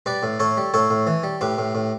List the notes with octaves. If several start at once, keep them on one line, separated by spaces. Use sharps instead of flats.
G3 B4 D5
A2
A2 A4 C#5
G3
A2 A4 C#5
A2
E3
G3
A2 G4 B4
A2
A2